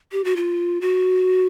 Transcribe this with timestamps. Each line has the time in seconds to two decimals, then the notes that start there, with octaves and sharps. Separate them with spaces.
0.12 G4
0.24 F#4
0.36 F4
0.81 F#4